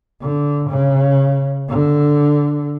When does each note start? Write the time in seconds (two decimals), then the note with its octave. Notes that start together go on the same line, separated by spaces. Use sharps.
0.22 D3
0.70 C#3
1.69 D3